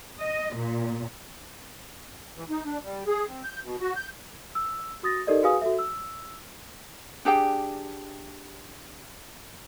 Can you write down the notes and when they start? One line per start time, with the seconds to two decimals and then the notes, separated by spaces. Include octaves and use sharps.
0.20 D#5
0.55 A#2
2.36 E3
2.50 D#4
2.65 D4
2.84 G3
3.08 G#4
3.28 C4
3.44 G6
3.64 B2
3.81 F#4
3.96 G6
4.55 E6
5.03 F#4 D#6 A6 A#6
5.27 D#4 G4 A4 A#4 D5 D#5
5.43 F#4 G#4 B4 F5 G#5 D#6
5.61 F#4 A4 E5
5.79 E6
7.25 D4 G4 G#4 G5